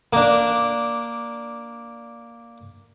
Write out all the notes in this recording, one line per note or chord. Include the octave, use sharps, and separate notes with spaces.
A#3 D4